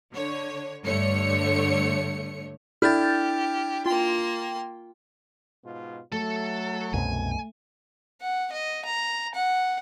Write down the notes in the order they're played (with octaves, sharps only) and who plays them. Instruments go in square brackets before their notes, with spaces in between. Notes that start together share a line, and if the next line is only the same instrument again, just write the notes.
[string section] D3 C#5
G2 D3 A3 C#5 C#7
[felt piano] D4 E4 A4 [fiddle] G4 [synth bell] F6 G6 A6
[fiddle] A#3 C6 [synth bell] F4 G5
[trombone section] G#2 B2 F4
[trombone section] F#3 [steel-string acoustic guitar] A3 [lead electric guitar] A4
[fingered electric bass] C2 F#2 B2 [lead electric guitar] G#5
[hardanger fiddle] F#5
D#5
A#5
F#5